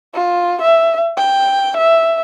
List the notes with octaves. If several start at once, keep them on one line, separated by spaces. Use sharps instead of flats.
F4
E5
G5
E5